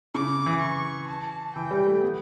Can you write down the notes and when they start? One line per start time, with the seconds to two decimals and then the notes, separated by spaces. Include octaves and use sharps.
0.14 C#3 D6
0.46 E3
0.61 C#6
1.08 A5
1.55 E3 G5
1.71 G3
1.87 A3
2.02 B3